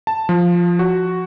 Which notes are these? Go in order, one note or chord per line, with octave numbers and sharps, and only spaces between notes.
A5
F3
F#4